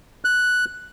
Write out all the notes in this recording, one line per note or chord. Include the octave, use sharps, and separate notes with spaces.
F#6